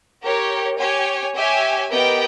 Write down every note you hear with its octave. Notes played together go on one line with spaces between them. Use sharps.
G4 A#4 C#5
G4 C#5 G#5
G4 C#5 E5 G#5
B3 G4 A#4 D#5 G5